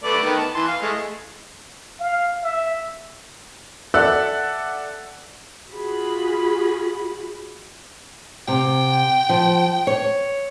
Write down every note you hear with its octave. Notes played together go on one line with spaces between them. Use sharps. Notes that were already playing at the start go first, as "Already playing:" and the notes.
A3 B4 D5
D#3 B3
A5
E3 C6
F5
G#3 A3
F5
E5
A4 D5 E5 F#5 E6 F#6
F4 F#4 G#4 B5
C3 G5
F3
C#5